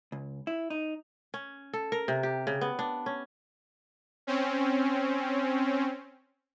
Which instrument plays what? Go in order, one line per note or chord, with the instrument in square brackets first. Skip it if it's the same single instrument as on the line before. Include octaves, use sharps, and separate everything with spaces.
[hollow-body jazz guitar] C#2
E4
D#4
[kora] C#4
A4
A#4
C3
G4
C#3
B3
D4
C#4
[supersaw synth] C4 C#4